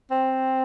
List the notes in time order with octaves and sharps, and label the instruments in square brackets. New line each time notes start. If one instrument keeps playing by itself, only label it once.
[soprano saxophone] C4